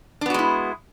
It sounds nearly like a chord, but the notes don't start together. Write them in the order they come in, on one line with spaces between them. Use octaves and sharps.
D4 B3 F#4 G#3 E4